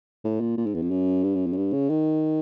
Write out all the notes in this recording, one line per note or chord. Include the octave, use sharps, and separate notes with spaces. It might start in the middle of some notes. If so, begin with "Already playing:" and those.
A2
A#2
A#2
G#2
E2
F2
F#2
G2
F#2
F2
F#2
G2
C#3
D#3